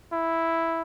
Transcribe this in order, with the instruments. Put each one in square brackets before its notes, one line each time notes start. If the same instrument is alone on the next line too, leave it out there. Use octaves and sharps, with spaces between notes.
[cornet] E4